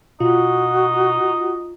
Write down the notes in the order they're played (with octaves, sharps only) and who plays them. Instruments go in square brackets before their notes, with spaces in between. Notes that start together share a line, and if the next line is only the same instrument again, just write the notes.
[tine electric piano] B2 [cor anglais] D#4 [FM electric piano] F4 [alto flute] F#4